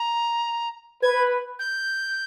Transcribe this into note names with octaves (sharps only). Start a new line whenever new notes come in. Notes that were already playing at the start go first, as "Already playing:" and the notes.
Already playing: A#5
B4 G#6
G6